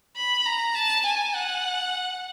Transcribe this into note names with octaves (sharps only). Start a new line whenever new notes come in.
B5
A#5
A5
G#5
F#5